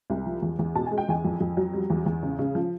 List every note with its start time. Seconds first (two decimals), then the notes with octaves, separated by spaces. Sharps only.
0.10 C2
0.26 F3
0.42 E2
0.59 E2
0.75 B2 A5
0.86 G#5
0.92 G#3
0.98 G5
1.09 E2 G#5
1.25 F2
1.41 F2
1.57 F#3
1.74 G3
1.90 E2
2.06 E2
2.23 C#3
2.39 C#3
2.55 F3